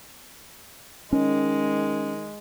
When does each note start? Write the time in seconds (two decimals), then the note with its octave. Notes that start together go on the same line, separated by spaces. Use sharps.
1.13 D#3 G#3 C#4